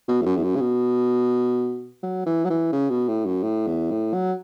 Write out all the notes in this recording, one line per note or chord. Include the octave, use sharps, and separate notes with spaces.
B2
E2
F#2
E2
F#2
C#3
B2
F#3
E3
F#3
E3
C#3
B2
A2
F#2
A2
E2
A2
F#3